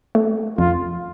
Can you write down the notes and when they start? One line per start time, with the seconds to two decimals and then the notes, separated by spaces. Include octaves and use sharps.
0.15 A3
0.58 F2 F4